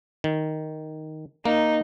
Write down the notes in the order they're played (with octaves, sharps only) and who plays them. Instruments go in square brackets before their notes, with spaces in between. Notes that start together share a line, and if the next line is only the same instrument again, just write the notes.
[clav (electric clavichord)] D#3
[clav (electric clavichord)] A#3 [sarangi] D#4